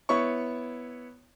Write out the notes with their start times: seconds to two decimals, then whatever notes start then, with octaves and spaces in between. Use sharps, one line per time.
0.09 B3 E4 C#5 C#6